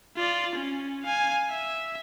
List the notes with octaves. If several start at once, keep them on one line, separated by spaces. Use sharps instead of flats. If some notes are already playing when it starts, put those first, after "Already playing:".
F4 D5
C#4
F5 G#5
E5